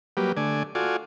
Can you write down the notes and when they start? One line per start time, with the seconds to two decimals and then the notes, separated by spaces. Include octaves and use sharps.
0.17 F#3 G3 A#3 G4 B4
0.37 D3 A3 D5 G#5
0.75 F4 F#4 A4 D5 G#5